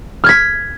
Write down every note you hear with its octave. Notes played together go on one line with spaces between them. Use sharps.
F6 G#6 B6